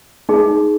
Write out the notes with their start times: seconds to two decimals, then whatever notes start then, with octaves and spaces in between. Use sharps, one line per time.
0.29 D#4 G#4